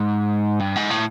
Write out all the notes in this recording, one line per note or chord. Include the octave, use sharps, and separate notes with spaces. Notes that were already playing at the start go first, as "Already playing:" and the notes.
Already playing: G#2
G2
G#2
A2